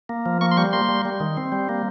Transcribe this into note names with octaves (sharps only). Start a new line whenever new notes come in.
A#3
F3
A#3 C#6
C6
G3 C#6
A#3 C6
G3
G3
D#3
C4
G3
A#3